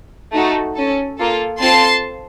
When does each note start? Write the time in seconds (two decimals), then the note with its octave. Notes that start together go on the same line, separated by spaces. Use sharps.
0.32 A3 D#4 F#4 A4
0.76 C#4 A4
1.18 A#3 F4 A4
1.61 C4 F4 A4 A5 C6